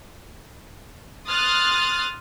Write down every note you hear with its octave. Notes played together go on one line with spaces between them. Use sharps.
C6 D#6 F6 F#6 A6